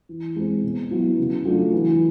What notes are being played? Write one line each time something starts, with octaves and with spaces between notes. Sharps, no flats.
E3
G#3 C4
B2
F#3 B3 E4
C#3
F#3 A3 D4 F4
E3